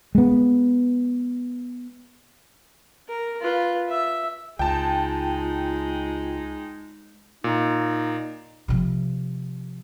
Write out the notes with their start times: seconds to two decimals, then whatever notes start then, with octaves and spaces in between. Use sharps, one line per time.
0.15 G#3 B3
3.08 A#4
3.41 F4 B4
3.89 E5
4.59 C#2 G#3 D#4 F4 G5 A5
7.44 A#2 D#4
8.68 C3 F3